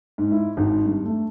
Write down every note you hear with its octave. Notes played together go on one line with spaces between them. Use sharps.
G#2
E4
G#1
G2
A3